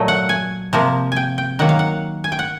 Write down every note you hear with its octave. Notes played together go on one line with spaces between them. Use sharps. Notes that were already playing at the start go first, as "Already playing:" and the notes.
Already playing: A#2 F#3 A3 D#5
F#5
G#5
C3 F3 A#3
G5 G#5
G5
D#3 F#3 A#3 F#5
F5
F#5
G#5
G5
F#5